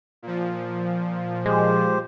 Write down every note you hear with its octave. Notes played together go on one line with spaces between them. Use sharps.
A#2 F3
G#3 G4 C5